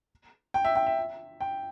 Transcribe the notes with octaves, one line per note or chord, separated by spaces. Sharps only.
G5
E5
G5
E5
G5